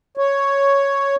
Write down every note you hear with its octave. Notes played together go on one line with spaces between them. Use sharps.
C#5